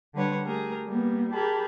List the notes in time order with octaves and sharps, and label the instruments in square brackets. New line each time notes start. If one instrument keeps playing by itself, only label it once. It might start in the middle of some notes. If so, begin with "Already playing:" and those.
[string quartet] D3 G3 B4 C#5 F#5
A3 G4 G#4 A#4
G3 A#3 B3
G4 G#4 A#4 A5 B5